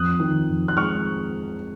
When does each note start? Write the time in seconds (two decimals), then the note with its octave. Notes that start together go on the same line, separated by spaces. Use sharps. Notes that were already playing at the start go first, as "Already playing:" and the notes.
Already playing: F2 D#6 F#6
0.20 D#3
0.49 F2
0.68 F#6
0.77 G#3 C#6 F6